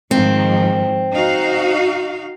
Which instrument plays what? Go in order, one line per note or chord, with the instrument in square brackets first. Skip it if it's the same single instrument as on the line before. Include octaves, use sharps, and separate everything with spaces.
[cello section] G#2 D#3 F3 [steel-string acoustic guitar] C4
[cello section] D#4 F#4 F5